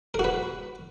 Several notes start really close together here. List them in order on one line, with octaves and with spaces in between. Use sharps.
A#4 F#4 B4